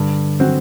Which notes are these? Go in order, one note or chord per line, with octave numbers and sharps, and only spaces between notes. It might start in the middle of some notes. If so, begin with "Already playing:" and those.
Already playing: G2 D3
F#3 C4 F#4